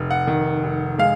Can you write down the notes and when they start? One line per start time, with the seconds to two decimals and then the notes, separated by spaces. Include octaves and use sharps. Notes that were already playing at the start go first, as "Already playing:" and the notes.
Already playing: F1
0.11 F#5
0.27 D#3
0.64 F1
0.98 G#3 F5